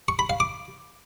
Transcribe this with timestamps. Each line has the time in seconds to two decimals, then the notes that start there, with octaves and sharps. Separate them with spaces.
0.08 C#6
0.19 B5
0.30 F5
0.40 D6